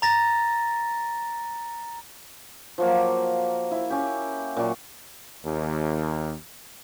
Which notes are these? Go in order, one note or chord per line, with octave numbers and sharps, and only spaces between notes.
A#5 A6 A#6
F3 F#3 A#3
E4
C#4 G4
A#2 F#3 D5 C#6
D#2